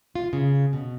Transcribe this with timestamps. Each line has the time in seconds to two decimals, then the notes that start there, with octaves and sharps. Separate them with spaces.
0.15 F4
0.33 C#3
0.73 B2